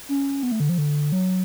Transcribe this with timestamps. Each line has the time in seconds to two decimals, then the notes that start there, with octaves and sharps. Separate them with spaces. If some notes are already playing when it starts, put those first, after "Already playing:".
0.09 C#4
0.43 B3
0.52 A3
0.60 D3
0.69 F3
0.78 D3
1.12 F#3